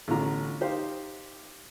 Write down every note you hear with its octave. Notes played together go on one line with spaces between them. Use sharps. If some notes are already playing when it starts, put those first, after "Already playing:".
A1 B2 D3 C#4 F4 A#5
D#4 G4 C5 F5